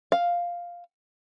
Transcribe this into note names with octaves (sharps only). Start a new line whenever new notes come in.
F5